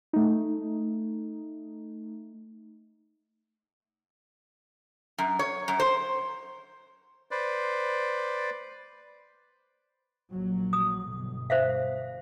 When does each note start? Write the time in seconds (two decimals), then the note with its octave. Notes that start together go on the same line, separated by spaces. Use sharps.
0.13 A3 D#4
5.18 F#2
5.39 C#5
5.68 F#2
5.80 C5
7.31 B4 C5 D5
10.32 A#1 F#3
10.73 D#6
11.09 G1 B2
11.50 C5 E5 F5